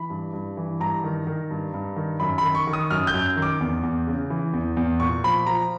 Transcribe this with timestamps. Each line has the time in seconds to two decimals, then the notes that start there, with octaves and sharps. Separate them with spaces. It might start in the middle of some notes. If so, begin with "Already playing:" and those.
Already playing: E3 B5
0.10 G2
0.33 G2
0.57 E3
0.80 G2 A#5
1.04 D#3
1.27 D#3
1.51 G2
1.74 G2
1.96 D#3
2.20 F#2 B5
2.38 D#3 B5
2.55 C#6
2.67 D#3
2.73 D#6
2.90 F#2 F6
3.07 G6
3.14 F#2
3.36 D#3
3.42 D6
3.61 E2
3.83 E2
4.07 C#3
4.30 E3
4.53 E2
4.77 E2
5.00 A#2 C#6
5.24 F3 B5
5.47 F3 A#5